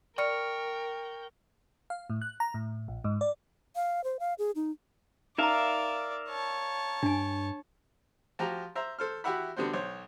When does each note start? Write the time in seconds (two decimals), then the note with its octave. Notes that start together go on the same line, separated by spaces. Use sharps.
0.18 A#4 D5 G5 C#6 F6 C#7
1.90 F5
2.10 A2
2.22 F#6
2.40 A#5
2.54 A2
2.88 A#1
3.04 G#2
3.21 D5
3.76 F5
4.04 C5
4.20 F5
4.39 G#4
4.56 D#4
5.38 D#4 A#4 D5 E5 F5 A#5
6.29 C#5 A5
7.03 G2 D4 G#5
8.39 F3 F#4 G4 A#5
8.75 C5 E5 A#5
8.99 A4 C5 F6
9.24 E4 F#4 G4 E5 F#5 B5
9.57 D3 G3 B3 F#4 C5
9.73 B1 C5 C#5